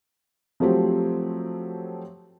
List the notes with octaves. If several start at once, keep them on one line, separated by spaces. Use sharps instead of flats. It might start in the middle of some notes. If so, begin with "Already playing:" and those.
F3 F#3 A3 C4 G4